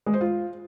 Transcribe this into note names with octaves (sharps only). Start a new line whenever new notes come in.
G#3
C5
F4